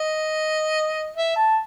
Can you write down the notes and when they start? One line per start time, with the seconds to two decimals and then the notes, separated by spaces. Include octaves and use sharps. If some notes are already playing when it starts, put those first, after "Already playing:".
Already playing: D#5
1.17 E5
1.36 A5